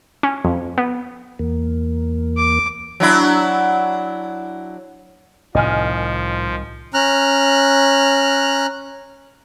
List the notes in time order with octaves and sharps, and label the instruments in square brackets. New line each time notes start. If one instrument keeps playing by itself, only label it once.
[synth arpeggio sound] C#4
F2
B3
[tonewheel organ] E2 A#3
[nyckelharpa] D6
[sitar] F#3 D4 E4
[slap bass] C2 D#3 [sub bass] A2 [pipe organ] F3 [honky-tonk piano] D#5 G#5 F6
[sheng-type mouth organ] C#4 A#5 F6 F#6